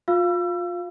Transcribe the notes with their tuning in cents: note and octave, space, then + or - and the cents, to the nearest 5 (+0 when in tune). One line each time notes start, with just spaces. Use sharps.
F4 +25 F5 -15 E6 +30